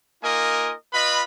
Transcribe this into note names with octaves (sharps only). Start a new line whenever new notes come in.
A#3 D#4 F4 A#4 D#5 G#5
F4 B4 D#5 B5